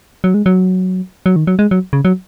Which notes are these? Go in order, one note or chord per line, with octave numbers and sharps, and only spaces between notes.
F#3
G#3
F#3
F#3
D#3
F#3
G#3
F#3
C#3
F#3